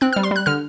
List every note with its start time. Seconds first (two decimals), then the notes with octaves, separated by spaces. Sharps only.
0.01 C4 F#6
0.13 F6
0.16 G3
0.23 C6
0.31 G3 F#6
0.46 D3 F6